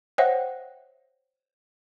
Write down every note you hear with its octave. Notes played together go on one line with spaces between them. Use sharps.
C5 C#5 E5 F#5 G5